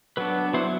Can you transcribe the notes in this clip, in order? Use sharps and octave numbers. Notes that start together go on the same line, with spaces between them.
F#3 B3 D4 B4
F#3 B3 E4 C5